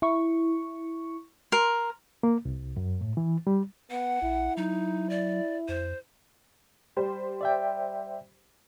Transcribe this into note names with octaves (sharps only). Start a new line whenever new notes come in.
E4 C#6
A#4 C6
A#3
C2
F#2
A2
E3
G3
B3 F#5
A#1 E4
F#3 D#4
D5
F2 C5
G3 G4 C5
D5 E5 G5